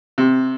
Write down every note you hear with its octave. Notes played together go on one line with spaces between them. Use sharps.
C3